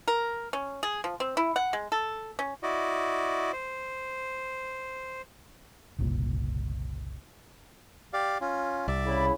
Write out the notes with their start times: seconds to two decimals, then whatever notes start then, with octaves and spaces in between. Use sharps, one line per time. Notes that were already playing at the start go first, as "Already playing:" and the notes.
0.08 A#4
0.53 C#4
0.83 G#4
1.04 F3
1.20 C4
1.37 E4
1.56 F#5
1.73 G#3
1.92 A4
2.39 C#4
2.63 E4 F#4 D5 D#5
3.53 C5
5.99 F#1 C2 A#2
8.13 G4 D5 F5
8.41 C#4 F4
8.88 C2 D5 E5
9.06 C#3 E4